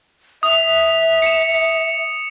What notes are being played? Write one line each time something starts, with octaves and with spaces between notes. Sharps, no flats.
E5 D#6
C#7 E7